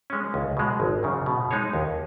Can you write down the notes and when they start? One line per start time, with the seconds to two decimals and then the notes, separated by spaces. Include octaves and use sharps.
0.10 G#3 C#4
0.34 C#2
0.57 B2 G#3
0.80 G#1
1.03 F#2 C#3
1.26 B2
1.51 G#3 D#4 G#4 C#5
1.73 D#2